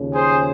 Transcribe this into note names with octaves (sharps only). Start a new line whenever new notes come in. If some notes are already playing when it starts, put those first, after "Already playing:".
Already playing: D#2 C#3 F3
G#4 C5